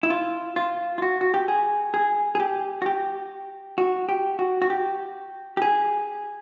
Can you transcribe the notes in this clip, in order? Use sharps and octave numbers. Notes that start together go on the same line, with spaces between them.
E4
F4
F4
F4
F#4
F#4
G4
G#4
G#4
G#4
G4
F#4
G4
F#4
G4
F#4
F#4
G4
G4
G#4